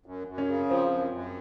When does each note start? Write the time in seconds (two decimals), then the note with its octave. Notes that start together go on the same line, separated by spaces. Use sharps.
0.06 F#2
0.27 F#2
0.38 C#4
0.48 C#3
0.69 F3 C4
0.91 F#2
1.12 F#2